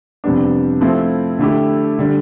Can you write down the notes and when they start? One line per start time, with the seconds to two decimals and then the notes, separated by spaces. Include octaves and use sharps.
0.24 F2 C3 G3 B3 D4
0.81 F3 A3 C4 E4
1.39 D3 A3 E4 G4
1.99 D3 G3